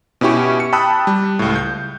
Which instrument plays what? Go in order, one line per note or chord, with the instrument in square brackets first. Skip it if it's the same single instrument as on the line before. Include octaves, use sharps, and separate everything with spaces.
[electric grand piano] B2 C#4 E4 G4 C#6
C#7
G5 A5 B5 D#6 E6 F#6
G3
C#2 A2
G6